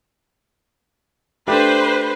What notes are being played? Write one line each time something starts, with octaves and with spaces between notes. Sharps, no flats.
A3 D4 G4 B4 C5